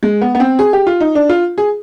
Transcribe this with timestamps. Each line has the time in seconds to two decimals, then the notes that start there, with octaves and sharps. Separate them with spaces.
0.03 G#3
0.22 B3
0.35 B3
0.40 C4
0.59 G#4
0.73 G4
0.87 F4
1.00 D#4
1.15 D4
1.29 F4
1.58 G#4